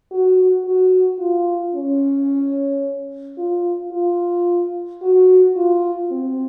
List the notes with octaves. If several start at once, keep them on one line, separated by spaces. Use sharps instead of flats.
F#4
F#4
F4
C#4
F4
F4
F#4
F4
C4